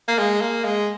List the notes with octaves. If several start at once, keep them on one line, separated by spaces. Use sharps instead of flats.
A#3
G#3
A#3
G#3